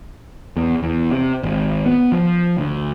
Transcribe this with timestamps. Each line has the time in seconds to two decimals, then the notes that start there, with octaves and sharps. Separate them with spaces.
0.57 E2
0.83 E2
1.11 C3
1.43 G#1
1.86 B3
2.12 F3
2.58 D2